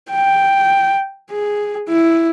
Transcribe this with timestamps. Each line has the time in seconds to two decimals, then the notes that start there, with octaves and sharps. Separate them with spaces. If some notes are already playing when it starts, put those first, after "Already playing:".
0.10 G5
1.31 G#4
1.89 E4